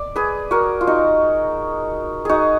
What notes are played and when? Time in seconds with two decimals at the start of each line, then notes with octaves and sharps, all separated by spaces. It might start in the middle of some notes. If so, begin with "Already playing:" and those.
Already playing: D5
0.16 G#4 B4
0.51 F#4 A#4
0.81 F4
0.87 D#4 F#4
2.25 D#4 F#4 G#4